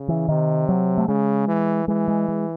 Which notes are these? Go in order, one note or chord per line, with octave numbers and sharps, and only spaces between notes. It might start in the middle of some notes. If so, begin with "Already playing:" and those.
Already playing: C#3
E3
C3 D#3
F#3
A3
C#3 G#3
E3
E3 G#3
G#3
G#3